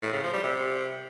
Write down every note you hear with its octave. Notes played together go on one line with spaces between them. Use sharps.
A2
C#3
F3
G3
C3